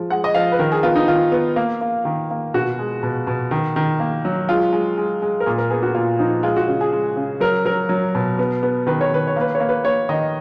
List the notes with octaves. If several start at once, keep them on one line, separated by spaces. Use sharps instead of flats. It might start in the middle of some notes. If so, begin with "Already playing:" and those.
Already playing: F3 G#3
G#3 F#5
D#5
F3 F5
B4
D#3 A#4
G#4
B3 F4
D#4
D#3 F4
B3
A#3
A#3
D#3
A#3
B2 F#4
G#3
B2
B2
D#3
D#3
A#3
F#3
G#3 F4
G#3
G#3
G#3
A#4
A#2 G#4
A#4
B3 G#4
F#4
A#2 F4
F3 D#4
G#3 F4
F#4
C#3 F4
G#4
G#3
C#3
F#3 A#4
F#3 A#4
F#3
B2
B3
B3
D#3 B4
C#5
D#3 B4
C#5
A#3 B4
C#5
A#3
B4
A#3 C#5
D#3 D#5